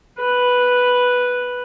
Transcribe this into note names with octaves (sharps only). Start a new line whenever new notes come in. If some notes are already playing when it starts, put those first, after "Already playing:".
B4